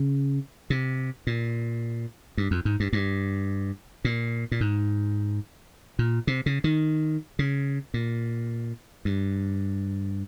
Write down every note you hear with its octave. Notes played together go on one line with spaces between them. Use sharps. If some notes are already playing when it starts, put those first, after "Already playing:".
Already playing: C#3
C3
A#2
G2
F2
G#2
G2
G2
A#2
A#2
G#2
A#2
C3
C#3
D#3
C#3
A#2
G2